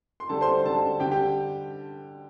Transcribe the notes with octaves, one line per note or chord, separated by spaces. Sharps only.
C6
D3 G3 A4 A5
C5 C6
D3 G3 A4 A5
D3 G3 G4 G5
G4